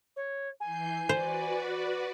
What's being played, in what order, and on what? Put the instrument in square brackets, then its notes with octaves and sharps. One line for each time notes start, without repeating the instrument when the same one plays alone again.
[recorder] C#5
[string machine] E3 G6 C7 [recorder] G#5
[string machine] F#4 B4 D5 [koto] C5